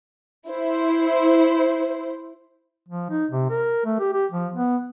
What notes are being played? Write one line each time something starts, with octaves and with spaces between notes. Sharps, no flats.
E4 C5
F3
D#4
C3
A#4
A3
G4
G4
F3
B3